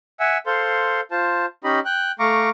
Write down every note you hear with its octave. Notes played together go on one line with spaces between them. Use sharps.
E5 F#5 G#5
A4 C5 F5 C6
F4 C5 A5
C#4 D#4 G4 D#5 B5
G5 F#6
A3 F5 A#5 C#6 D6